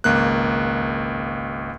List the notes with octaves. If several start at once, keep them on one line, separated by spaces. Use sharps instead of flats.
G#1 C#2 A#3 F#6